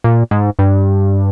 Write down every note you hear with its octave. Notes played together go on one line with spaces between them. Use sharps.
A#2
G#2
G2